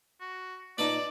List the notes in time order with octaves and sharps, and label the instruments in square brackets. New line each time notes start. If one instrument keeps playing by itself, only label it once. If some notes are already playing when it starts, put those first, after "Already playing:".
[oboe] F#4
[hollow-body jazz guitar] A#2 D#4 [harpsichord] B4 A5 D6 [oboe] D5